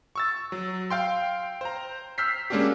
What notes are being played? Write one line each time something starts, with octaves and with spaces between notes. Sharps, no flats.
C#6 E6 A6
F#3
F5 G5 C6
C5 A#5
E6 F6 G6 B6 C7
G#3 A#3 C#4 D4 F#4 G4